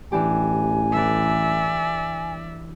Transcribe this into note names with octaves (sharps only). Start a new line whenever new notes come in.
A1 E3 D4 G4 G#5
E3 A4 D5 E5